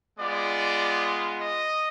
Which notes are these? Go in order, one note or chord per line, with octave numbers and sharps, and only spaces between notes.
G#3 B3 F4 D5
D#5